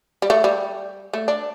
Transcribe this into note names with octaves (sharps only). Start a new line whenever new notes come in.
G3
A3
G3
A3
D4